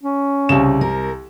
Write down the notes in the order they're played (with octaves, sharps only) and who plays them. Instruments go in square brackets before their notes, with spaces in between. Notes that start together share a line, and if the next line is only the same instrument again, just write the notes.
[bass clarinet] C#4
[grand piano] C2 E7 [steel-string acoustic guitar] C#3
[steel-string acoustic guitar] A#4